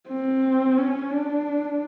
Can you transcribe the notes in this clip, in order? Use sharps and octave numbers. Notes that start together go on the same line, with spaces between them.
C4
C#4
D4